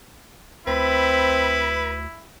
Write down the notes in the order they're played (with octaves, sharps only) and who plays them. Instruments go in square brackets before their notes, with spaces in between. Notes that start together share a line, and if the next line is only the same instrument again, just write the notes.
[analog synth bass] D2 [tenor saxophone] C4 [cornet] E4 [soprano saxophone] B4